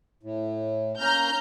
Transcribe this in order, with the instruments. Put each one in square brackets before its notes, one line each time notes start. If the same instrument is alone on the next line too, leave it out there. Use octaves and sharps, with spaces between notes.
[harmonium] A2
[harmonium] A#3 C#4 [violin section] A#5 F6 G6